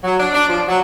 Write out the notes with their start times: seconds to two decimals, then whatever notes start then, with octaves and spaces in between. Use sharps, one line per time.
0.04 F#3
0.20 D4
0.34 D4
0.49 F3
0.67 F#3